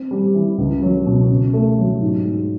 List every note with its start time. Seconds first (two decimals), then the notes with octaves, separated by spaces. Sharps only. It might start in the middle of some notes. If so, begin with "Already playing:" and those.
Already playing: C4
0.11 G3
0.34 E3
0.58 C#2
0.82 F#3
1.06 B2
1.30 C#3
1.53 A3
1.78 F#3
2.01 G#2
2.25 G#3